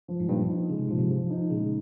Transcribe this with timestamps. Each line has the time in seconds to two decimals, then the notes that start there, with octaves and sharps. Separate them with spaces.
0.08 F3
0.20 G#2
0.28 G2 A#2 F3
0.48 D#4
0.69 C#3 G#3
0.79 C3
0.89 A#2 F3
0.98 G#2 C3
1.10 F3
1.30 D#4
1.50 A#2 C#3 G#3